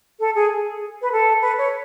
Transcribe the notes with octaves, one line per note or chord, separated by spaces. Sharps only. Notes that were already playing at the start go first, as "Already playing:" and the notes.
A4
G#4
B4
A4
B4
C#5